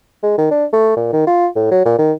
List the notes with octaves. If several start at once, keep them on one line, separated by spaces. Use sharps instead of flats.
G#3
D#3
D4
A3
A#2
D#3
F4
A2
F#3
A#2
D#3